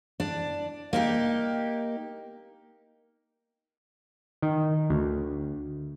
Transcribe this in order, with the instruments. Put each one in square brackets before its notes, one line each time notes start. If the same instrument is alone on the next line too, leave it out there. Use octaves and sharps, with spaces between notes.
[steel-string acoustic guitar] D4
A#3 D#4 G4
[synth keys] D#3
D2